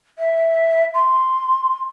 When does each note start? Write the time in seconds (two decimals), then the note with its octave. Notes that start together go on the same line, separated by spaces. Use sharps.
0.18 E5
0.94 C6